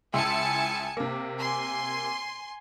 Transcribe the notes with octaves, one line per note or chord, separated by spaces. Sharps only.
C#2 E4 G#5 A5 C6 C#7
C3 A#3
G#5 C6